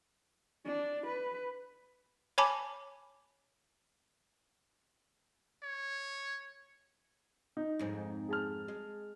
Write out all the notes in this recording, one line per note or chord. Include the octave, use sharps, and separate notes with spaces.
D4
B4
C#5 G#5 A5 B5 D6
C#5
D#4
F2 G#2 C4
G#4 A5 F6
G#3